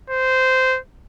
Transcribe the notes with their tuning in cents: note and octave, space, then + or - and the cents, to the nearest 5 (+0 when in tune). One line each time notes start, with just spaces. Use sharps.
C5 -15